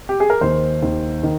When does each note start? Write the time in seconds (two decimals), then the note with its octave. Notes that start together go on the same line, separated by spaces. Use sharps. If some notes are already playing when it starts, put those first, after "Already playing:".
0.09 G4
0.20 G#4
0.30 A#4
0.41 D#2 D#3 C5
0.82 D#2 D#3
1.23 D#3